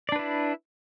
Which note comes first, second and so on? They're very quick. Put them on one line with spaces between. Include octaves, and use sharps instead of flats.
D5 D4 B4 E4